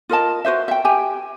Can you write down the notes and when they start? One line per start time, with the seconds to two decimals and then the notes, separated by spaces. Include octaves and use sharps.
0.09 F4 A#4 D#5 A5
0.45 F#4 B4 C5 E5
0.68 E5 G5
0.85 G4 E5 G5 G#5